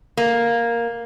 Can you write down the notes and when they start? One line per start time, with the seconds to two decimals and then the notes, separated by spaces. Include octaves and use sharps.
0.17 A#3